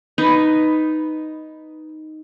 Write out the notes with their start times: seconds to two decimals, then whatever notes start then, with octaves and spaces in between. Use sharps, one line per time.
0.18 B3 D#4 B4